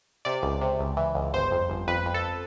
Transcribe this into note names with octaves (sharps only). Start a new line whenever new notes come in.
C3 D5
C#2
C3
C#2
E3
C#2
G1 C5
F2
G1
F2 B4
F2
A4